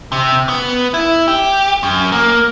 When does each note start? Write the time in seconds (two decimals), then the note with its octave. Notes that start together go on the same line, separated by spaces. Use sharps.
0.12 C3
0.49 B3
0.94 E4
1.28 G4
1.83 F#2
2.12 A#3